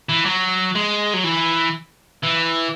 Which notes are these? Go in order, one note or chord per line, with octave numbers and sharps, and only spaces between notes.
E3
F#3
G#3
F#3
E3
E3